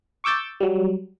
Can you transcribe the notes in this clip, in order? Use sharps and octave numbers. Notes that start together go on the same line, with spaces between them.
C#6 D6 E6 G6 A6
F#3 G3